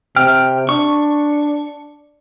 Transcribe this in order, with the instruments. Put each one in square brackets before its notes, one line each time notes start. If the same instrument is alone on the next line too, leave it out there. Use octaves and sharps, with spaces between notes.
[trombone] C3 [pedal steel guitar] G5 F6
[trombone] D4 [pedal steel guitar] C#6